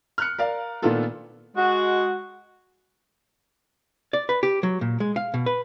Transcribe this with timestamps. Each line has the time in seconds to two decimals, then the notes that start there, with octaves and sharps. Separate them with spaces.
0.18 F6 F#6 C#7
0.38 A#4 D5 F5
0.82 A#2 D#3 A3 B3 F4 A4
1.56 G#3 F#4
4.13 D5
4.29 B4
4.43 G4
4.63 F#3
4.81 A#2
5.00 G#3
5.16 F5
5.34 B2
5.46 B4